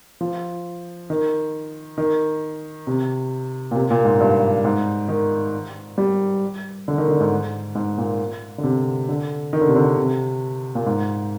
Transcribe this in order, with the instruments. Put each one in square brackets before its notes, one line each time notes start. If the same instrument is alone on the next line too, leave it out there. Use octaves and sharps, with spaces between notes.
[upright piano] F3
D#3
D#3
C3
A#2
C3
A#2
G#2
G2
G#2
D#3
G3
D3
D#3
D3
G#2
G#2
A#2
D3
C3
D3
D#3
D3
C3
D3
C3
A#2
G#2